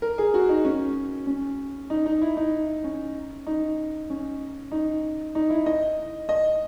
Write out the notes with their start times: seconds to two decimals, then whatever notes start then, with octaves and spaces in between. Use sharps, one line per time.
0.02 A#4
0.18 G#4
0.34 F#4
0.49 D#4
0.65 C#4
1.27 C#4
1.90 D#4
2.06 D#4
2.22 E4
2.37 D#4
2.84 C#4
3.47 D#4
4.10 C#4
4.72 D#4
5.35 D#4
5.50 E4
5.66 D#5
6.29 D#5